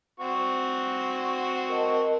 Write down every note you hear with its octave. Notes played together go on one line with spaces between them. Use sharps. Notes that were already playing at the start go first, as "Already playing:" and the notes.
C4 F#4 C#6
A#4 D#5 A5